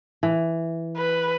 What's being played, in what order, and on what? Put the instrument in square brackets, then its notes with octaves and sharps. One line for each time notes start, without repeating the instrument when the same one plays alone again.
[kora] E3
[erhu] B4